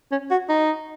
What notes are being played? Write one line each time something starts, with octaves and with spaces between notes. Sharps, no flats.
C#4
F#4
D#4